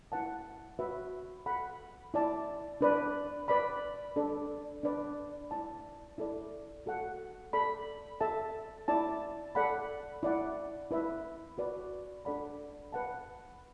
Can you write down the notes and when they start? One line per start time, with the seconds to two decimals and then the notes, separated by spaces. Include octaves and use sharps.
0.12 E4 B4 F#5 A5
0.79 F#4 B4 E5
1.46 A4 F#5 B5
2.14 E4 D5 A5
2.81 D4 B4 D5
3.48 B4 D5 B5
4.16 D4 A4 D5
4.83 D4 B4 D5
5.51 E4 D5 A5
6.18 E4 A4 D5
6.86 F#4 A4 F#5
7.53 A4 D5 B5
8.21 A4 E5 A5
8.88 E4 D5 A5
9.55 A4 D5 F#5 B5
10.23 E4 D5 F#5
10.91 E4 B4 E5
11.58 F#4 B4 D5
12.25 D4 A4 D5 F#5 B5
12.92 B4 F#5 A5